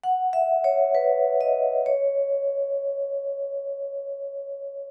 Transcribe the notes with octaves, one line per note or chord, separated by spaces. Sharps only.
F#5
E5
C#5
B4
D#5
C#5